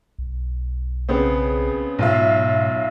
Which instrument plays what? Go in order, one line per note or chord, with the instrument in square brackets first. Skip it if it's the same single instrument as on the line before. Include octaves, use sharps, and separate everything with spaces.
[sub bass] B1
[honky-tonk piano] C#3 B3 C4
[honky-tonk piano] B1 F4 E5 [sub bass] G#2